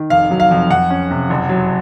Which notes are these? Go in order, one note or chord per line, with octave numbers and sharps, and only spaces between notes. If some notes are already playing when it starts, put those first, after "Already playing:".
Already playing: D#3
F1 F5
F#3
F5
F2
F2 F#5
C#4
C3
F#1
F#3